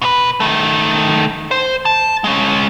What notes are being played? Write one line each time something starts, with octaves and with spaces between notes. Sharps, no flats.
B2 B4
D#3 A3
C5
A5
G#3 C#4